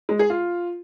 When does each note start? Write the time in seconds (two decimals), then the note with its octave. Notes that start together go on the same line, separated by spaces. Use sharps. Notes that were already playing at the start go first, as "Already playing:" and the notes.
0.09 G#3
0.19 G#4
0.30 F4